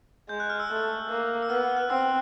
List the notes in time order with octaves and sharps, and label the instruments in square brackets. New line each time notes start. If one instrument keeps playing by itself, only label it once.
[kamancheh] G#3 [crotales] G6
[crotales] F#6
F6
E6
[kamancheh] A3
A#3
[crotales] E6
[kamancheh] B3 [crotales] F6
[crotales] F6
F#6
[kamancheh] C4 [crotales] E6